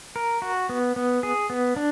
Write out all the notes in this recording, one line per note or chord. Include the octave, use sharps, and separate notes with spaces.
A#4
F#4
B3
B3
G#4
B3
D4